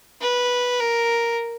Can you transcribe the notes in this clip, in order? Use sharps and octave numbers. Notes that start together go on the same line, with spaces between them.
B4
A#4